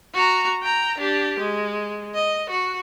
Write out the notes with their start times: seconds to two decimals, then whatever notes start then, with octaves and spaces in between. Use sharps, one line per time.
0.14 F#4 A#5
0.63 G5 A#5
0.98 D4 G4
1.40 G#3
2.14 D#5
2.50 F#4